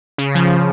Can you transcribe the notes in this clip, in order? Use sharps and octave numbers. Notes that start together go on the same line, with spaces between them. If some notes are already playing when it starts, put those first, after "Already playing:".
C#3
F3